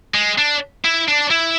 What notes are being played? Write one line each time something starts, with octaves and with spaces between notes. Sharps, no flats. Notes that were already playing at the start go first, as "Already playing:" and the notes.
G#3
D4
E4
D4
E4